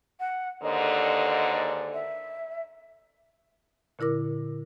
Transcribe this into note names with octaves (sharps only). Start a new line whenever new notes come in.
F#5
D#2 G#2 D3 D#5
E5
A#2 D3 E4 A#4 D6